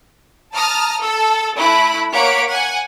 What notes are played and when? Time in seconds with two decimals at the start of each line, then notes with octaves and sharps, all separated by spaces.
0.54 A5 A#5 D#6 F6
1.00 A4 E6
1.58 A3 E4 B5 F#6
2.13 A#3 C#5 F#5 B6 D7
2.48 F#5 G#5